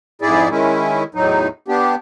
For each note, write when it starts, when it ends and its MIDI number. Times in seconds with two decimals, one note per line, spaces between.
0.22 0.49 41
0.22 0.49 44
0.22 0.49 64
0.22 0.49 68
0.22 0.49 74
0.50 1.03 51
0.50 1.03 56
0.50 1.03 61
0.50 1.03 64
1.15 1.47 40
1.15 1.47 45
1.15 1.47 54
1.15 1.47 63
1.68 1.95 59
1.68 1.95 62
1.68 1.95 67